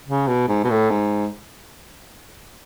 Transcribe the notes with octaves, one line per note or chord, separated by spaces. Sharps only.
C#3
B2
G#2
B2
A2
G#2